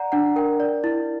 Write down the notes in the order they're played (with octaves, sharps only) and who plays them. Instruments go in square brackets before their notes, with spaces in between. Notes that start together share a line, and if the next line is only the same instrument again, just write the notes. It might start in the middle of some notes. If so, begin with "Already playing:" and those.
Already playing: [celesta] D5 F#5 A#5
D4 F#5
A#4 G5
D5
E4